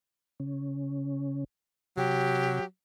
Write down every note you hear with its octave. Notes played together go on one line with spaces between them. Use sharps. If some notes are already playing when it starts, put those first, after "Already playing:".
C#3 C#4
C3 F#3 G4